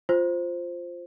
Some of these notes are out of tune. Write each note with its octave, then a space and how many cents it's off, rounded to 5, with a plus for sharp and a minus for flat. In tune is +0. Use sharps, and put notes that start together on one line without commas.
F4 +0 C5 +0